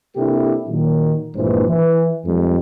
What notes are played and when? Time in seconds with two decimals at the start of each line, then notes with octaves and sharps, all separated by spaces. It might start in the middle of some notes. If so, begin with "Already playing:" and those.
0.16 C3 A#3 D4 E4 G4 A4
0.68 A#2 D#3 F#3
1.36 A#1 G2 A#2 E3 G#3 C5
1.68 E3
2.26 F2 G3 G#3